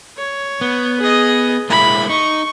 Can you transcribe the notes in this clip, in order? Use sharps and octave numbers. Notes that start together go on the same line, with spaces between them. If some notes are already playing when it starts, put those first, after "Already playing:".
C#5
B3
G#4 D#5
G#3 A#3 E4 B5
D#4 C#6